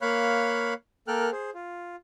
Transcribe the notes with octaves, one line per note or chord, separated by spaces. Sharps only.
A#3 C#5 F5 B5 F#6
A#3 A4 A#4 G5 F6 F#6
G#4 C5
F4